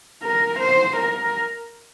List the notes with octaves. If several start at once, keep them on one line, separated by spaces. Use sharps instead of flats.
A#4
C5
A#4